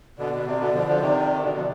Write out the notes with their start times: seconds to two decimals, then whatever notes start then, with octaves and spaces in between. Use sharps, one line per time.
0.18 B2 D3 D5
0.32 B2
0.46 C3
0.60 B2 D3
0.73 D3 F3
0.87 D3 F3
1.01 C3 D#3
1.42 B2 D3
1.58 F3